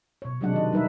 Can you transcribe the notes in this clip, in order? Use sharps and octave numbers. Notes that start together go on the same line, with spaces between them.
B2 C#5
C3 F#3 G#3 D4 F#5
D#3 D#5
G3 D#4 B4 E5